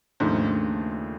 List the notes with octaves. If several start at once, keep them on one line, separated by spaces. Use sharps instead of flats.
D#2 G#2 C#3 F3 A3 D4